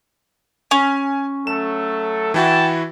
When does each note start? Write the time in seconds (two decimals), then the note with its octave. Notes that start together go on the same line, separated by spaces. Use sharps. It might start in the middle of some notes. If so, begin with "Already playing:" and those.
0.71 C#4 G#5
1.47 F#3 A3 A4 E7
2.34 E3 E4 F#4 G5 A5